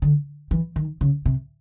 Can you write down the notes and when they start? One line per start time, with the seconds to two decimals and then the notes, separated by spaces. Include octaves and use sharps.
0.02 D3
0.51 E3
0.76 D#3
1.01 C#3
1.25 C3